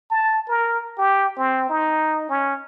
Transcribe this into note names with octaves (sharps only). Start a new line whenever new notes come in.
A5
A#4
G4
C4
D#4
C#4